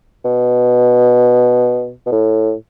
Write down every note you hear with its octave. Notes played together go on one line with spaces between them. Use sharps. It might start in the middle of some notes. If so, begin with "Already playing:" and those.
B2
B2
A2